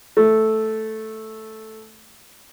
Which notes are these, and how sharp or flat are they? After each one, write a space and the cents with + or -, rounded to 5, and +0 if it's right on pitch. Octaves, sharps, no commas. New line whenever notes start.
A3 -5